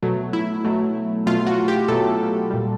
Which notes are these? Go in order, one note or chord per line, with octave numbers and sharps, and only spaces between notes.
B2 F#3 A3
E4
B2 F#3 A3
B2 F#3 A3 F4
F#4
G4
B2 F#3 A3 A4
A#2 G3